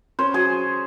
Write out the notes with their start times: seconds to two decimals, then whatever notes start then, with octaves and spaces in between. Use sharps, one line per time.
0.19 C#4 C5
0.34 F#3 G#4